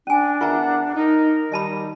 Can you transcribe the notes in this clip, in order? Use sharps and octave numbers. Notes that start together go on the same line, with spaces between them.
C#4 D4 G#5
E2 F4 A#4 E5 F#5 A#5
D#4 A#4
D#3 G3 D#5 A5 B5